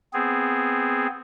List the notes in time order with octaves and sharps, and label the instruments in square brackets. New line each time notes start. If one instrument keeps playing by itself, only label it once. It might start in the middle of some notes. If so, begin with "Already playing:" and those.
[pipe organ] B3 C4 G#4